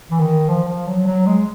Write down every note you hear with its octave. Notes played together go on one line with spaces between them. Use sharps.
E3
D#3
F3
F3
F#3
F#3
G#3